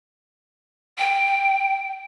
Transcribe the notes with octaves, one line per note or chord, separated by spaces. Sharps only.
G5